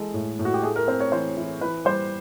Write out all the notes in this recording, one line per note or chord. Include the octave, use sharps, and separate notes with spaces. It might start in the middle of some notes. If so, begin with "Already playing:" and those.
Already playing: E3 G#3 A4
A2
A2
F#4
G4
A3 G#4
A#4
C4 C5
C#5
E3 C5
E3
E3 B4
G3 C5